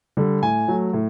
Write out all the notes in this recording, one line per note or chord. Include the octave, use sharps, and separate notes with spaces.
D3 G3
A2 G#5
F#3 A3
A2